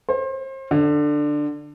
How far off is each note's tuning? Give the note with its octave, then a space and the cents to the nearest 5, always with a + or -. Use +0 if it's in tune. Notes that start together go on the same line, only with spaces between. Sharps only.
C5 +35
D3 +10